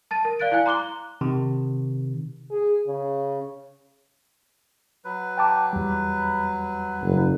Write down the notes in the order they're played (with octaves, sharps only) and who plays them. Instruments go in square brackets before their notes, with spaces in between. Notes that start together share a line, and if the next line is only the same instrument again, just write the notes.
[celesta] A5 A6 D#7
A#4
D5 F5 F#6 A6 D7
E4 D5 F5 G#5 F#6
A#5 C6 D6 F#6 G7
[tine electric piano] C3 D#3
[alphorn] G#4
C#3
[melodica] F#3 B4
[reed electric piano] G5 A5 D6
E2 G3
[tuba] F#1